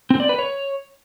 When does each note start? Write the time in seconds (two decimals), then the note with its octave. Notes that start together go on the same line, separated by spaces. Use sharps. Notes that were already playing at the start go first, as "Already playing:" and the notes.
0.10 C4
0.20 D5
0.29 B4
0.39 C#5